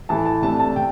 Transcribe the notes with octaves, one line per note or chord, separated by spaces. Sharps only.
A2 E3 A3 A5
A5
C3 A3 D4 A5
A5
C3 G5